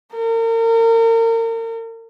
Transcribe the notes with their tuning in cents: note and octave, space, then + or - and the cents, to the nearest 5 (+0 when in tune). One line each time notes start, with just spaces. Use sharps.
A#4 -35